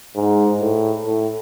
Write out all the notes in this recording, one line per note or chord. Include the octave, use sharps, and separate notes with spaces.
G#2
A2
A2